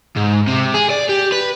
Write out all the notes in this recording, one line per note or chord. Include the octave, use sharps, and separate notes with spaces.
G#2
C3
G#4
D5
G4
B4